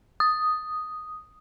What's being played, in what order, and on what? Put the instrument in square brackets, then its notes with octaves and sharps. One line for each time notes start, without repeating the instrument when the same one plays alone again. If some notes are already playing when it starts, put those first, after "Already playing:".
[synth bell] D#6